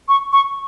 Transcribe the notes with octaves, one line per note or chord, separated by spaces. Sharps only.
C#6
C#6